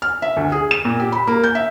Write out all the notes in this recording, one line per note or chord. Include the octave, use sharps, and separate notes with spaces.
F6
E5
D2
G#4
E7
A#2
G4
B5
A#3
G6
E5